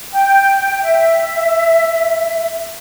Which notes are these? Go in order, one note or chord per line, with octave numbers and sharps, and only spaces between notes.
G5
E5